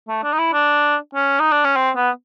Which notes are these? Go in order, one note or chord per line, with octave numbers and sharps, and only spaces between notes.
A3
D4
D#4
E4
D4
C#4
D#4
D4
C#4
C4
B3